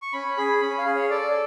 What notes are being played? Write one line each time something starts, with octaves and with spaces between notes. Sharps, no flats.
C#6
C#4 B5
G#4 B5
C#4 B5
F5
G#4
C#5
A4 D5